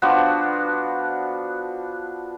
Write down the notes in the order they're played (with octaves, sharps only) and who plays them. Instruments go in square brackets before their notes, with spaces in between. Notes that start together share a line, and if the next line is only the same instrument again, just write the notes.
[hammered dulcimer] F3 B3 D4 F#4